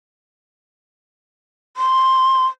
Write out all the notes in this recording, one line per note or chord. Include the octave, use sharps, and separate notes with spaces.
C6